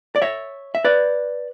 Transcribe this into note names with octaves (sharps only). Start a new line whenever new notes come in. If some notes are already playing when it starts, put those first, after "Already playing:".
D5
C#5 E5
E5
B4 D5